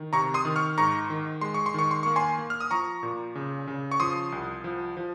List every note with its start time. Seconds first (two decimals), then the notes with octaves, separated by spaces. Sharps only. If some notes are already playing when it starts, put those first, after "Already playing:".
Already playing: D#3
0.13 C3 A#5 C#6
0.34 C6 D#6
0.45 D#3
0.56 C#6 F6
0.78 G#2 A#5 C#6
1.10 D#3
1.41 G#3 C6
1.54 C#6
1.66 C6
1.74 D#3 C#6
1.91 C6
2.03 A#3 C#6
2.16 G#5 C6
2.38 A#3
2.50 F6
2.60 D#6
2.71 F3 A#5 C#6
3.03 A#2
3.35 C#3
3.67 C#3
3.92 C#6
4.00 F3 C6 D#6
4.32 C2
4.64 F3
4.97 F3